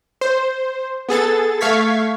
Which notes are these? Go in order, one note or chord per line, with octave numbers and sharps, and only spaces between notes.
C5
B3 G#4 A4 A6
A3 F5 C#6 G#6 B6